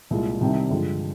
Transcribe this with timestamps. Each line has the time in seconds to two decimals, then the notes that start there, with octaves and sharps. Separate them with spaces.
0.10 C2 A#2 G#3
0.41 C2 C3 D#3 G3
0.70 G2 D3 F3 G#3